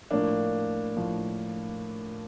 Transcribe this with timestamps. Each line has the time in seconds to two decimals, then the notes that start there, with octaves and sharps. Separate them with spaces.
0.11 A2 F3 A#3 D4
0.97 A2 F3